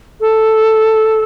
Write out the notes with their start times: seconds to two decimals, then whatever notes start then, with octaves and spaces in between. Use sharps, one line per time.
0.20 A4